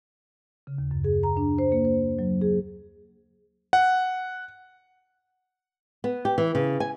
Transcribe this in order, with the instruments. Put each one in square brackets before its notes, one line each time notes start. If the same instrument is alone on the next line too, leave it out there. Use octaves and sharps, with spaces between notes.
[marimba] C#3
D#2
F#2
G#4
A#5
D4
C5
A#3
C5
F#3
G#4
[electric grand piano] F#5
[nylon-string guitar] B3
G4
E3
C#3
G#5